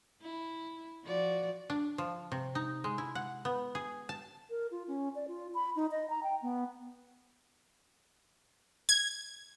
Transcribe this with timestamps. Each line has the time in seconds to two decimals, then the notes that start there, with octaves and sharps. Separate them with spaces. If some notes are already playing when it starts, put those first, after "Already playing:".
0.21 E4
1.04 F3 F#4 D5
1.70 D4
1.98 F3
2.32 C3
2.55 D#4
2.84 G#3
2.98 E4
3.15 F#5
3.45 B3
3.75 G#4
4.09 A5
4.50 A#4
4.71 F4
4.88 C#4
5.15 D5
5.28 F4
5.54 B5
5.76 D#4
5.91 D#5
6.10 A#5
6.23 G5
6.42 B3
8.89 G#6